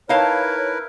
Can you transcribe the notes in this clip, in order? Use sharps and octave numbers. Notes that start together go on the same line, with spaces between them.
D#4 E4 A#4 B4 C#5 F5 A5